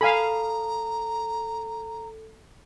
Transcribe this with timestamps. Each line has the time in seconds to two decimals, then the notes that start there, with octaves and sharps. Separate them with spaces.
0.01 A4 F5 G#5 A#5 B5